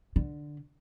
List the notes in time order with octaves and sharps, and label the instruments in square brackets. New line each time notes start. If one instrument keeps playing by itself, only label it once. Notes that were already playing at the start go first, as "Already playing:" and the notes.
[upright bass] D3